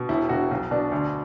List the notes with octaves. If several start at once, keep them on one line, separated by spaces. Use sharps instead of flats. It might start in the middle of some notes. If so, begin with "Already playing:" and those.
Already playing: B2
E1 E4
E1 F#4
B1
B2 D4
D2